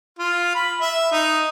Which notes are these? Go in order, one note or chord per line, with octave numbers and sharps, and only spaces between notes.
F4
B5
E5
D#4